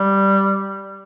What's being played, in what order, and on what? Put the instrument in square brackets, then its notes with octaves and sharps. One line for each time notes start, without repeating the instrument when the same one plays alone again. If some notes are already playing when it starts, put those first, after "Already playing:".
Already playing: [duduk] G3